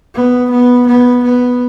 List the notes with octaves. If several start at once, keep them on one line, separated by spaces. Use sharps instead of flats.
B3
B3
B3
B3